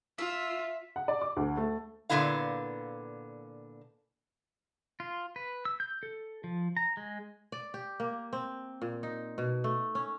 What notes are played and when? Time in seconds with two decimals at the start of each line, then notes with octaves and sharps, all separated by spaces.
0.18 F4 E5
0.96 F#5
1.08 D5
1.22 D6
1.37 D2
1.57 A3
2.10 A#2 D3 G#3 B3 E4 F5
5.00 F4
5.36 B4
5.65 E6
5.80 G6
6.03 A4
6.44 F3
6.77 A#5
6.97 G#3
7.52 D5
7.74 G4
8.00 A#3
8.33 C4
8.82 A#2
9.03 D#4
9.38 B2
9.64 A3
9.95 C#4